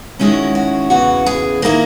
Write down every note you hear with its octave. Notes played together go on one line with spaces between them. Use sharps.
D#3 G#3 C#4 E4 F#4
F#4
E2 C#3 E3 F#4
G#4
D#3 A#3 E4 A#4